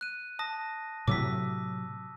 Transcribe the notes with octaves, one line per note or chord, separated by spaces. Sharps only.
F#6 D#7
A5 D#6 A#6
A2 C3 F#3 D6 E6 B6